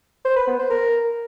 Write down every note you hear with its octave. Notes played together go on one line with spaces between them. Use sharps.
C5
B4
B3
C5
A#4